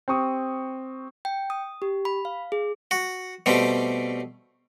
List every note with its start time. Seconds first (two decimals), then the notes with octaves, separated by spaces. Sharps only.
0.08 C4 G4 C#6 D#6
1.25 G5
1.50 D#6
1.82 G4
2.05 B5
2.25 F5
2.52 G#4
2.91 F#4
3.46 B2 G3 A3 C4